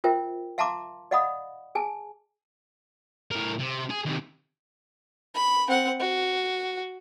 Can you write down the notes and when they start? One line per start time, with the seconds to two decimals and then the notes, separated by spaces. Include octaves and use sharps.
0.04 F4 A#4 C5 E5 G5
0.58 E5 F5 A5 A#5 C6 D6
1.11 D5 D#5 F5 F#5 B5 D#6
1.75 G#4 G#5 A5
3.31 A2 A#4
3.60 C3
3.90 G#4
4.05 D#2 C3
5.35 B5
5.68 C4 F#5
6.00 F#4